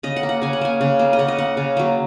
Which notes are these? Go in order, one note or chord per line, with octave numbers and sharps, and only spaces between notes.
C#3 D#5
F#5
A#3
F#5
C#3 G#5
F#5
A#3 G#5
C#3
A#3
D#5
C#3 F#5
D#5
A#3 F#5
C#3
F#3 A#3